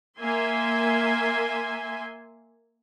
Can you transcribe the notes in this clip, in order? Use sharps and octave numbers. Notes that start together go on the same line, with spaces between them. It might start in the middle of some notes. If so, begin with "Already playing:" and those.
A#3 E5 G#5 C6